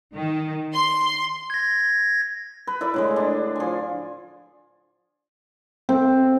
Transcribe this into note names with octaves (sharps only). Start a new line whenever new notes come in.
D#3
C6
G#6 A#6
B4
E4 A4 A#4 D5
A2 D3 G#3
D4
F3 G#5
C4